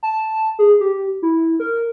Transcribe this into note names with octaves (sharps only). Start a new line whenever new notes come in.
A5
G#4
G4
E4
A#4